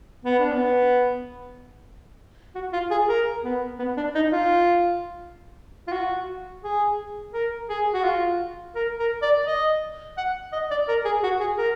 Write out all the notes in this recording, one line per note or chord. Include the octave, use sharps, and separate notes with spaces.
B3
D4
B3
F#4
F4
G#4
A#4
B3
B3
D4
D#4
F4
F4
F#4
G#4
A#4
G#4
F#4
F4
A#4
A#4
D5
D#5
F#5
D#5
D5
A#4
G#4
F#4
G#4
A#4